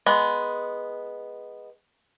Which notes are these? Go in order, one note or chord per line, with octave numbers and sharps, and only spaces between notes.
G#3 B3